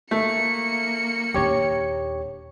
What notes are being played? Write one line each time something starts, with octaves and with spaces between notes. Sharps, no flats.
A3 A#3 C#7
D#1 D4 G4 C#5